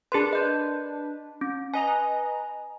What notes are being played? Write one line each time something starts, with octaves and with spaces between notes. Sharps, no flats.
D4 G#4 A#4 B4 C6
D#5 G6
C#4
B4 D#5 G#5 A#5